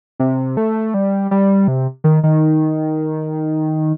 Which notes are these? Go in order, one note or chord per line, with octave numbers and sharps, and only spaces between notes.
C3
A3
G3
G3
C3
D#3
D#3